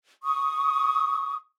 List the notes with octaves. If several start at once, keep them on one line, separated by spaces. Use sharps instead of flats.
C#6 D#6